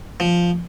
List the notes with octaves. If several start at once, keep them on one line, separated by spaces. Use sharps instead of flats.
F3